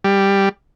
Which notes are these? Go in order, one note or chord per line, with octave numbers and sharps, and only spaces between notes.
G3